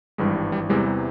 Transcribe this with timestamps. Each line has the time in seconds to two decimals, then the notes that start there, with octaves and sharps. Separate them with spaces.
0.18 G#1 G2 E3 G3 G#3
0.35 G3
0.52 G3
0.69 E2 C3 E3 G3 G#3
0.87 G3